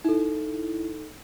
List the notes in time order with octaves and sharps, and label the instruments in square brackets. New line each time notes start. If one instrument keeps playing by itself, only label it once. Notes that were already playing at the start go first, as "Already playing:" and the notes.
[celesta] D#4 A4 [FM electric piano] E4